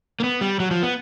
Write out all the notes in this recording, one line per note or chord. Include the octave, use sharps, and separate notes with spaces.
A#3
B3
G3
F#3
F3
B3